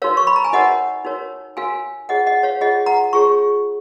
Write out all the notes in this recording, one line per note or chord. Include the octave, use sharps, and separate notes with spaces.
D#4 F#4 A#4 C#5 F5
C#6
B5
A#5
G#5
D#4 F#4 A#4 C#5 D#5 F#5
D#4 F#4 A#4 C#5
D#4 F#4 A#4 C#5 F5 G#5
F4 G#4 C#5 D#5 F#5
D#5 F#5
C#5 F5
F4 G#4 C#5 D#5 F#5
F#5 A#5
F4 G#4 C#5 C#6